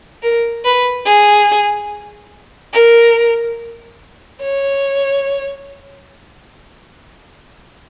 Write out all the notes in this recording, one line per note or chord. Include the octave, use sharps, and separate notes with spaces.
A#4
B4
G#4
A#4
C#5